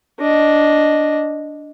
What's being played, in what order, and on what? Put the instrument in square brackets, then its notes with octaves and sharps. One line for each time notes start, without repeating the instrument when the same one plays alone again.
[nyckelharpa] D4 D#5